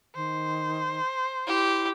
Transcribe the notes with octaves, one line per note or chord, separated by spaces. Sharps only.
D#3 C5
E4 G4